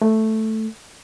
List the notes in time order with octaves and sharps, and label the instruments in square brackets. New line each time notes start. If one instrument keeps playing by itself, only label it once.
[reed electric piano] A3